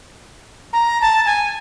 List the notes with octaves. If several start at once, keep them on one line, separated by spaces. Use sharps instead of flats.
A#5
A5
G#5